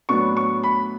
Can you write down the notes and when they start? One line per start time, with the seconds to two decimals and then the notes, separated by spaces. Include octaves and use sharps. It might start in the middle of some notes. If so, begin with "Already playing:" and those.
0.09 A2 F#3 B3 D4 C#6
0.37 C#6
0.63 B5